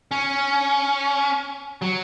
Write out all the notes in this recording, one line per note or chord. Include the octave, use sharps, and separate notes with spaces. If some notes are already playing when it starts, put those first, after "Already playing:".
C#4
F#3